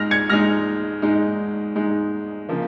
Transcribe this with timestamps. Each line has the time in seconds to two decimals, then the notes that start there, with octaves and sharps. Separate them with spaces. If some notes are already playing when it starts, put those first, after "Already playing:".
Already playing: G#2 G#3 D#4 F6 A#6
0.11 G#6 C#7
0.30 G#2 G#3 D#4 F6 A#6
1.02 G#2 G#3 D#4
1.75 G#2 G#3 D#4
2.49 C#3 F3 A#3